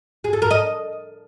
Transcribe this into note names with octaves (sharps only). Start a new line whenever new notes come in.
G#4
A4
A#4
D#5